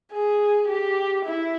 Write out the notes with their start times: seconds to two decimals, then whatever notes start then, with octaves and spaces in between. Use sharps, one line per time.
0.13 G#4
0.68 G4
1.25 E4